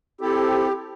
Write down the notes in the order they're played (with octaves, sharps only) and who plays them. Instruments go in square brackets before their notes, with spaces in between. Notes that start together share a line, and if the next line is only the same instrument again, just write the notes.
[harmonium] C4 E4 A4 [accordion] G4